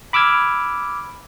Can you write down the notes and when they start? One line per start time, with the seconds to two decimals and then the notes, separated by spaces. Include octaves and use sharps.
0.13 B5 D6 E6 F6 G#6